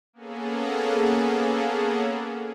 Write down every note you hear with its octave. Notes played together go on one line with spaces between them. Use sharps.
A#3 B3 C#4 G#4 A4